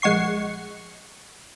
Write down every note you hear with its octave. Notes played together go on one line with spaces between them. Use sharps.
A#1 G#3 F#5 C#6 C7